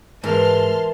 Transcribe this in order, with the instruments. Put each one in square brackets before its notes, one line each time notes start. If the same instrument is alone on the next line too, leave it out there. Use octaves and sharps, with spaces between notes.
[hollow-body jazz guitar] G#2 [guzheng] E3 [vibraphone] A#4 [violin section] A5 C6 F6